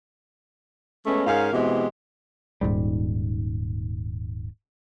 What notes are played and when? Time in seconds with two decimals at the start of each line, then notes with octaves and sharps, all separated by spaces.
1.06 G#3 A3 B3 C#4
1.27 G#2 C#4 A#4 F5
1.53 B2 E3 G#3 C4 G4
2.61 D#1 F2 G#2 G3